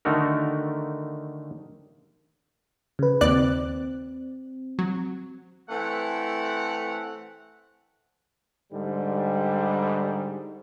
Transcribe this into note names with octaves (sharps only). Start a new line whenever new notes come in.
D3 D#3 A3 D#4 F#4 A#4
C#3 B4
D#2 C4 D5 F#6
F#3
E3 A3 C4 F#5
G#2 D3 G3